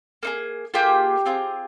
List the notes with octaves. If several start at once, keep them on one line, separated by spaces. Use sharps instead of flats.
A#3 D#4 G#4
A#3 F4 G4 G#4 G5
C4 F4 G#4